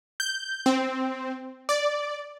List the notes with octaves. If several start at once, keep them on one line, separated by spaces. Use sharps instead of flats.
G6
C4
D5